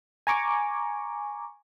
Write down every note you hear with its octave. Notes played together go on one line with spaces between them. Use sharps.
G#5 A#5 C#6 D6